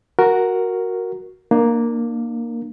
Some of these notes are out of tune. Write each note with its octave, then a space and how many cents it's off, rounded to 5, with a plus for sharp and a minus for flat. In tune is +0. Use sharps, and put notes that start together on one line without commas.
F#4 +0 A#4 +0
A#3 +0 D4 +40 A#4 +0